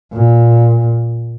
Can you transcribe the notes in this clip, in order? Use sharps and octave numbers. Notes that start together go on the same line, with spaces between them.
A#2